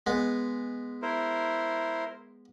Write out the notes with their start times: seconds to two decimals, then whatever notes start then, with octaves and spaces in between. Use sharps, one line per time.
0.07 G#3 B3
1.02 E4 A#4 C5